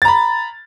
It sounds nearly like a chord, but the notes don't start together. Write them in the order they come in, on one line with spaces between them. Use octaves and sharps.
A6 A#5 B5